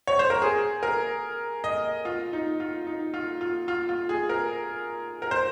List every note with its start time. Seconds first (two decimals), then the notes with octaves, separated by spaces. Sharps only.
0.07 C#5
0.19 C5
0.30 A#4
0.42 G#4
0.83 A#4
1.64 D#5
2.05 F4
2.33 D#4
2.60 F4
2.87 D#4
3.14 F4
3.41 F4
3.68 F4
3.89 F4
4.09 G#4
4.29 A#4
5.22 A#4
5.31 C5